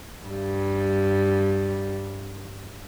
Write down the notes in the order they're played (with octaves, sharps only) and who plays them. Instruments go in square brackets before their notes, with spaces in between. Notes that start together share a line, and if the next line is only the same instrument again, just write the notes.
[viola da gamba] G2 G3